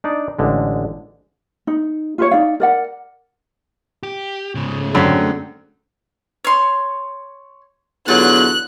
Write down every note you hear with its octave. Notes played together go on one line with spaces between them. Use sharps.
D4 D#4 D5
A1 D3 G#3
D#4
F4 B4 C#5
D#4 D5 F5
A#4 D5 F#5
G4
G#2 C#3 A3 C#4 G#4
F#2 D3 C4
C#5 C6
E2 D3 F#3 F4 F#6